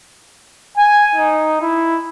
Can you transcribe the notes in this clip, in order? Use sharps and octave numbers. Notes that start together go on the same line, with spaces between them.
G#5
D#4
E4